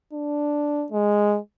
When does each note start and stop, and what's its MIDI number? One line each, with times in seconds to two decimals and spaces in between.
0.13 0.87 62
0.92 1.39 56